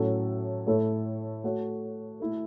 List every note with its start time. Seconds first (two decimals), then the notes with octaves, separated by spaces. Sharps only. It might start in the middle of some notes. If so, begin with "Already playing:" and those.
Already playing: A2 F#3 C#4 A4 C#5
0.67 A2 A3 E4 A4 C#5
1.44 A3 F#4 C#5
2.20 A3 E4 A4